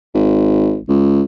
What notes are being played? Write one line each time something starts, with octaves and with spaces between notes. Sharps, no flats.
G#1
C#2